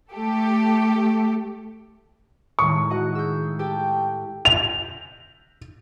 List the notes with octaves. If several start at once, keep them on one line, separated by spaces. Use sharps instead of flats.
A3 G4 A4
A2 D#3 G#3 C#6
F#4 D#5 F#5
G#4 E6 G6
G4 A4 G5
F7